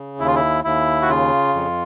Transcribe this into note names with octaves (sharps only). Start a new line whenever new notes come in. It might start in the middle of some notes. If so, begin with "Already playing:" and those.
Already playing: C#3
D#2 E4
F4
E4
D#2 E4
F#4
C#3 F4
F2